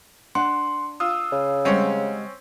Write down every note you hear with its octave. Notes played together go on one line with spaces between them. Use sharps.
D4 F#5 C6
F4 D#6 E6
C#3
G3 G#3 C4 C#4 C#5 F#5